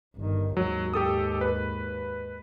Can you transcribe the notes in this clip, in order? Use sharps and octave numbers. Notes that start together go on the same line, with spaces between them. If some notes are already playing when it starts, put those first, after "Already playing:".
G1 D#3
D#2 G#2 F#3
G4 A4 D#6
B4